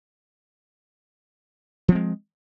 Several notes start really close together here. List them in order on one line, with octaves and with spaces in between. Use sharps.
F3 C4 G#3